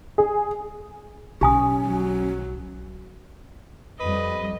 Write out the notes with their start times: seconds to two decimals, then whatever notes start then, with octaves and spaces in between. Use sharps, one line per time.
0.18 G#4
1.41 B1 C#4 G4 G#5 D#6
1.86 F#3
4.00 F2 G3 B4 D#5